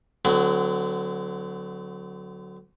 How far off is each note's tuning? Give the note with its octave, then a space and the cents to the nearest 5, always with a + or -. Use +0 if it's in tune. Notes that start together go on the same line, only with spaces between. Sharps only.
D3 +0 F#3 +0 C4 -45